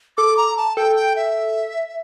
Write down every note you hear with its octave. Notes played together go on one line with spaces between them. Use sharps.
A4 D6
A#5
A5
A4 G5
G5
E5